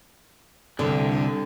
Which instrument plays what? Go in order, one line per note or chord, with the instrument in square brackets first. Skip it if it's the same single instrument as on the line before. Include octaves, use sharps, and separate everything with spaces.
[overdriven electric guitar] C2 [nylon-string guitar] D3